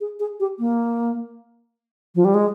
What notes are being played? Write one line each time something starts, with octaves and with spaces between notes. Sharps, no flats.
G#4
G#4
G4
A#3
F3
G3
G#3